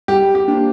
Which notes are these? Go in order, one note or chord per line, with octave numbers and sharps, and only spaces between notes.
G3 G4
G4
A#3 D4 F4 C5